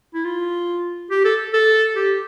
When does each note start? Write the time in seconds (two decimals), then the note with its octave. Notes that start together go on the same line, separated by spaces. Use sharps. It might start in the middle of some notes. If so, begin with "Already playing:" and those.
0.14 E4
0.25 F4
1.10 G4
1.25 A4
1.54 A4
1.96 G4